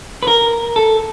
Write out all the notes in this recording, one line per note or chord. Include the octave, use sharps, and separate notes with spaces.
B4
A#4
A4